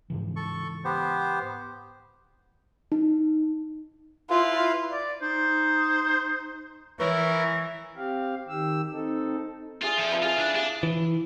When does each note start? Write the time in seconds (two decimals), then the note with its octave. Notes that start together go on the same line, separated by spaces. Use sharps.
0.10 G#2 C#3 E3
0.36 A4 C#6
0.85 B3 G4 C5
2.92 D#4
4.30 E4 F4 B4 F5
4.91 D5
5.22 D#4 C5
7.00 E3 E4 A#4 B4 C#5 C#6
7.97 C4 G4 F5
8.48 D#3 G4 E6
8.93 C4 D#4 A4
9.82 F4 G#4 D5 E5
9.98 F3 A4
10.11 F4 B4 D#5
10.23 E4 F4 G#4 D#5
10.39 D4
10.56 D4 G#4 F5
10.83 E3